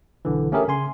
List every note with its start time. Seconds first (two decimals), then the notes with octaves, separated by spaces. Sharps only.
0.25 B1 D3 E3
0.52 A3 C#4 G4 G#4 A#4 E5
0.68 C#3 G#5 C6